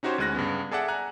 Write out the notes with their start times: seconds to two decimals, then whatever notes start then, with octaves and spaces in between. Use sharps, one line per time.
0.03 C#4 D#4 F#4 G4 C5 C#5
0.18 D2 G#3 C#4 F#6 A#6
0.35 G2 C#3 G3 B3
0.71 G#4 A4 D5 E5 F#5
0.88 G#5 A#5 F#6